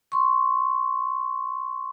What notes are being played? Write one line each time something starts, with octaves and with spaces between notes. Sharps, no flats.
C6 C#6